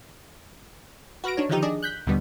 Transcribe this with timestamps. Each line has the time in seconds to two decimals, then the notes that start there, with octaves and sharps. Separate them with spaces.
1.24 F#4 B4 F6 A#6 D7
1.37 D4 D#4 C#5
1.49 D3 D#3 F3 D#4 G4
1.62 D4 G#4 D5 D#5
1.83 F#6 G6 B6
2.07 D#2 B2 D3 G3 B3